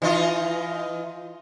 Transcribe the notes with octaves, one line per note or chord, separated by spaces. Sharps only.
E3 D#4 F4